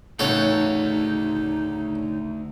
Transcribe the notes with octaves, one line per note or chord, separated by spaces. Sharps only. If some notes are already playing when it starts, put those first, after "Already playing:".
D2 A2 C#3 D#4 A4 C#5 F#5